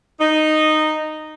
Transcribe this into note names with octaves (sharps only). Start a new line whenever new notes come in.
D#4